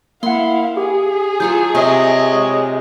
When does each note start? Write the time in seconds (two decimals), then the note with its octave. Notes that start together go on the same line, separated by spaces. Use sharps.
0.23 A#3 E4 F5 F#5 C6
0.77 G4 G#4
1.40 F#3 F4 A4 G6
1.75 C3 C#5 D#5
2.34 G#3